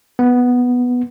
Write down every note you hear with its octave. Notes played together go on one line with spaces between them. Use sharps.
B3